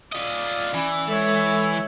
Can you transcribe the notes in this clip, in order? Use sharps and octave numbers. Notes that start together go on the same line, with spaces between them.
F4 D5 D#5
E3 C#4 B5
G#3 A4 C#5 E5